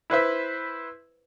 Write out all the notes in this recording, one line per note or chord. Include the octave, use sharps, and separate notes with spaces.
E4 B4 C5 E5